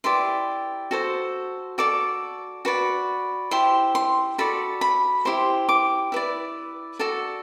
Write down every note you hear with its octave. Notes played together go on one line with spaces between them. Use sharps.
E4 G4 B4 D5 C6
F#4 A4 C5
F#4 A4 D5 D6
F#4 B4 D5
E4 G4 C5 C6
C6
F#4 A4 D5 B5
B5
E4 G4 C5 C6
D6
E4 B4 D5
F#4 A4 D5